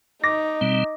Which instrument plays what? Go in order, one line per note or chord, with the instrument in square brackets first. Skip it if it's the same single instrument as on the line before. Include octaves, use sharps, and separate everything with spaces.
[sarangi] D#4 [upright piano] D6 A#6
[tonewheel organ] B2 G3 C4